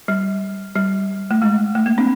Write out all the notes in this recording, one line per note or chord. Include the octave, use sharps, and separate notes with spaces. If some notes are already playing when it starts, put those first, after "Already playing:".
G3
G3
A3
G#3
A3
A#3
C4 D4